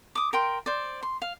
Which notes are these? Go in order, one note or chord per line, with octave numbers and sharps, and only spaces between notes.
D6 D#6
A#4 G5 C6
C5 D5
C6
F5